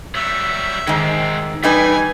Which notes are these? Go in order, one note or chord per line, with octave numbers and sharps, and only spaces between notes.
F#3 G3 E5
G#2 D#3 G#3 C4
E3 G3 D#4 B4 G#5